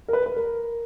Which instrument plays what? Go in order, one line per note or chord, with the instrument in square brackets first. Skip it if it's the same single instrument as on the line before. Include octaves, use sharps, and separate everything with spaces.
[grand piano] A#4
B4
B4
A#4